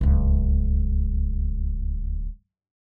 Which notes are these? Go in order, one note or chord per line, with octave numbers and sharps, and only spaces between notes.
D1 C#2